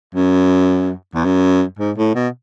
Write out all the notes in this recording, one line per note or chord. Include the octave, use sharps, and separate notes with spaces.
F#2
E2
F#2
G#2
A2
B2